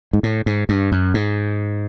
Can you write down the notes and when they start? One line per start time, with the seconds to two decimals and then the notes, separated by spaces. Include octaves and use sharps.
0.13 G#2
0.23 A2
0.46 G#2
0.69 G2
0.92 F#2
1.14 G#2